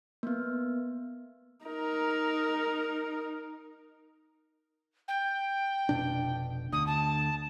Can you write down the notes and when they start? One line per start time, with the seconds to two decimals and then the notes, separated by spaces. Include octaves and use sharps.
0.23 A#3 B3
1.65 D#4 A#4
5.08 G5
5.89 F1 B2 D4
6.72 D2 D3 D#6
6.86 A5